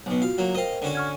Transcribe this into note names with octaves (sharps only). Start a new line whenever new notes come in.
B1 B2
F4 F#4 F5
F#3 A#3
A#4 C5 D#5 F5 G5
D3 C#4 F#4
C#6 F6 G#6